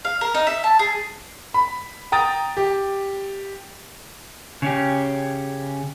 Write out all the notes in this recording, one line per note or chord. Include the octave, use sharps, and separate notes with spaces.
F5
A#4
D#4
E5
A5
G#4
B5
G5 A#5 D#6 A6
G4
C#3 C#4 G4